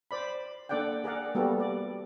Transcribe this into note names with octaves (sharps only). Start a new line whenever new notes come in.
C5 D5 B5
A#3 D4 A4 D5 F#5 G5
G#4 A#4 D5 F#5
G3 A#3 B3 F#4 G4 A4
D5